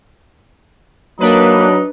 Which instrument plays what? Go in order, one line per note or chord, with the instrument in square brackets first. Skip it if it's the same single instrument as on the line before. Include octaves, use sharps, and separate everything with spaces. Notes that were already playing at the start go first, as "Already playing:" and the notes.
[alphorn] F#3 [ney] A#3 [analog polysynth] D4 B4 [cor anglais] D#4